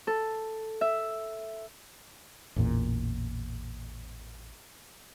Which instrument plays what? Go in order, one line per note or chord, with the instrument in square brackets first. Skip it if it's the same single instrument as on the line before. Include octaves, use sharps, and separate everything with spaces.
[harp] A4
E5
[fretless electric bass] A1 E2 A#2